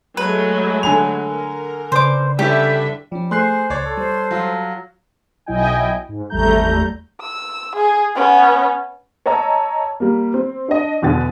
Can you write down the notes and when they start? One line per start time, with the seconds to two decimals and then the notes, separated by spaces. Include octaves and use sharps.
0.17 F#3 G#3 A3 B4
0.83 D3 G#5 F7
1.22 A#4
1.92 C#3 B4 C5 D5 D6
2.39 D3 G3 C#4 D4 E4 G4 E5
3.12 F3 G3 C#4
3.31 A3 G#4 C5 C6 F#6 C7
3.70 C#2 C#5 D5
3.85 A4 C6 C#6 A6
3.97 G3 C5
4.31 F#3 F4
5.46 B1 F#3 E4 D#5 G5 G#5
6.09 G#2
6.30 G#1 E2 G3 A3 A#5 G6
7.21 E6
7.76 G#4
8.15 B3 C#4
9.26 C#5 D#5 A5 A#5 E6
10.00 G3 A#3
10.34 C4
10.68 D4 D#5
11.02 E2 B2 D3 E3 G5 A6